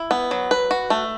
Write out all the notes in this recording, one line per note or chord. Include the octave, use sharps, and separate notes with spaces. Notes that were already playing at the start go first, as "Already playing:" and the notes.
Already playing: E4
B3
F#3
B4
F#4
A3